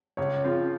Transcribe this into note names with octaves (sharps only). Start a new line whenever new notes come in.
C#2 C#5
C#3 F3 C4 F4